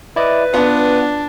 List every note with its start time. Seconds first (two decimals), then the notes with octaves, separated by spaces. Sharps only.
0.16 E4 B4 D5 D#5
0.54 B3 D4 F4